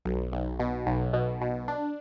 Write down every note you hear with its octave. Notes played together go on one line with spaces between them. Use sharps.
B1
B1
B2
B1
B2
B2
D4